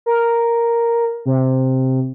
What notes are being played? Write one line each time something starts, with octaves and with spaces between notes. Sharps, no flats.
A#4
C3